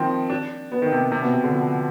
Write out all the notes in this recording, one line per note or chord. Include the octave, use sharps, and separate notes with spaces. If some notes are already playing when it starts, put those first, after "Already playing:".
Already playing: D#3 F3 C4
D4
B3
D#3
C3
C3
B2
C3
D3
F3